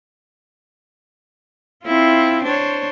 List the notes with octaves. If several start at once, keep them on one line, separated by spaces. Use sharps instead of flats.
C4 E4 F4
D4 C5 C#5